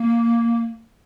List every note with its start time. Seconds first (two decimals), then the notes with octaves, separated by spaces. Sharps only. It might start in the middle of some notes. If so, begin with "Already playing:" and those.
Already playing: A#3